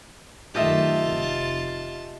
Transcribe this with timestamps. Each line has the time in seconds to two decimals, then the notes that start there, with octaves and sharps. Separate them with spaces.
0.55 F#2 D#3 A3 F4 G4 D#5 E5 A5
1.03 F1